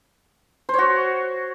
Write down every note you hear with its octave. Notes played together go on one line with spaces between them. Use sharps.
F#4 C5 C#5